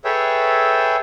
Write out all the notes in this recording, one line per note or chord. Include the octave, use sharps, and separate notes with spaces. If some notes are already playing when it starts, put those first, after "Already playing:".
G#4 A4 B4 C#5 E5 G5